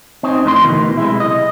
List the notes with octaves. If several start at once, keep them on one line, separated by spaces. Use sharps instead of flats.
C4 C#4 D#4
F2 A2 A#4 C6
D2 B2 D#3 E3
B1 C3 G#3 E4
D#5